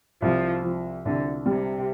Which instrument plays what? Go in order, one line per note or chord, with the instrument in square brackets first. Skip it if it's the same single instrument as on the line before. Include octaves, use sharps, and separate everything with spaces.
[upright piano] C2 [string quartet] F3
[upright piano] F3
[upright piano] C2 [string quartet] D3
[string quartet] C3 [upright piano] G3